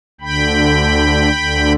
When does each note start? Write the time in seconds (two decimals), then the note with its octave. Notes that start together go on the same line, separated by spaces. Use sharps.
0.21 D2 D3 G5 B5
1.33 D2 D3